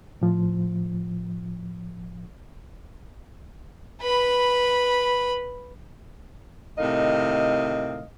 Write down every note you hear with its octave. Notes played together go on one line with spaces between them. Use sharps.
A2 F3
B4 B5
A2 C3 D#3 D#5 F5